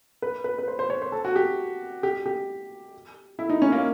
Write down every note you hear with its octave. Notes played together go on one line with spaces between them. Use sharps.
B4
B4
B4
C5
C5
C#5
C5
A4
F#4
G4
G4
G4
E4
D#4
C#4
A#3